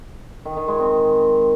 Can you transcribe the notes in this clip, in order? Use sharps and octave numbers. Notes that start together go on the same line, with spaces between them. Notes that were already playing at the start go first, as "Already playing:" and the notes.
D#3
D#3
G#3
C4